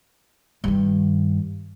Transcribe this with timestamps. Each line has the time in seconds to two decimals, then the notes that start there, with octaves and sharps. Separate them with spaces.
0.64 G2 D#3